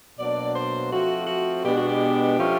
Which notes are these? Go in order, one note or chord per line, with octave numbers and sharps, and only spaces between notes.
B2 F#3 A#3 D4 D5
C5
F3 A3 C4 F#4
F#4
B2 G#3 B3 D4 G4
F#4
G4
F3 A3 C#4 F4